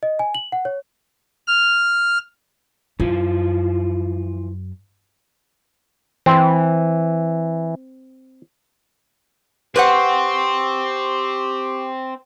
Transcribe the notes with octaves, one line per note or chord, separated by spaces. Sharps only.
D#5
G#5
F#7
F#5
C#5
F6
F#2 E3 F3 F4
E3 C4
C4 G4 B4 C5 F#5 C6 C#6